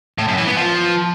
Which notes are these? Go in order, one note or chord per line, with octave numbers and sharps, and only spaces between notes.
A2
F#2
E3
B3
F3